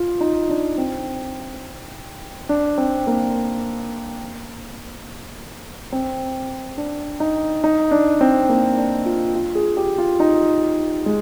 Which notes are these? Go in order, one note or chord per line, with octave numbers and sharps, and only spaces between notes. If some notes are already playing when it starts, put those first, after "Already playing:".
Already playing: F4
D#4
D4
C4
D4
C4
A#3
C4
D4
D#4
D#4
D4
C4
A#3
D4
F4
F4
G#4
G4
F4
D#4
G#3